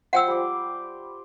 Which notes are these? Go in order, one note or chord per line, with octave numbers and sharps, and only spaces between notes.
F3 C5 F#5 G5 C6 E6
G3 D6